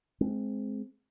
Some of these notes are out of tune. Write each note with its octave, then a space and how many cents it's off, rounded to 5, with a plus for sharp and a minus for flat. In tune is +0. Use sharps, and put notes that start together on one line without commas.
G#3 +25 C4 +0